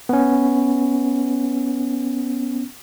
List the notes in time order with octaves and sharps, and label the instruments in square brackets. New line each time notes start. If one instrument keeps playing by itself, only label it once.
[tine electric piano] B3 C#4